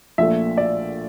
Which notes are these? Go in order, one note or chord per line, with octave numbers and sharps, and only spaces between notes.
A#1 A#2 A3 E5
D5